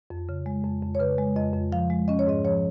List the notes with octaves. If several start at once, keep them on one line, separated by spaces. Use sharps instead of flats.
F2
C#3
G#3
F2
F2
C#5
C#3 B4
G#3
F2 D#5
F2
F3 F5
G#3
C#4 D#5
C#5
G#2 D#5
F3 C#5